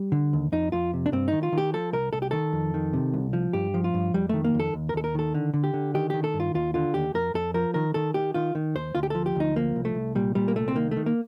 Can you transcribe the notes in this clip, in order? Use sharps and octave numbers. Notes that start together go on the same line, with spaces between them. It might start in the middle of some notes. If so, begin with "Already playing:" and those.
Already playing: G3
D3
D#2
F2 D#4
F2 F4
C3
D4
G2 C4
D#3 D#4
F4
D#3
G4
F3 A4
C2 A#4
C2 A4
G4
D#3 A4
F2
D#3
C3
C2
F3
G2 G4
F3
F4
G2
F2 G3
D#3 A3
A#3
F2
A4
D#2
A#4
D#2 A4
A#4
D#3 A4
D3
D3
G4
D3
D#3 G4
D#3 G4
A4
G2
F4
D#2 F4
D3 F4
D#2 G4
F2 A#4
F2 A4
F3 A#4
D#3 A#4
D#3 A4
D#3 G4
D#3 F4
D#3
D#2 C5
D2 F4
G4
F3 A4
G4
D2 D#4
F3 A#3
C2
A3
C2
A#2 G3
A#2 G3
A#3
C2 A3
C4
D#3 A#3
A3
D#3
A#3